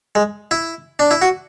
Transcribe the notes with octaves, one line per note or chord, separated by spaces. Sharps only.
G#3
E4
D4
E4
F#4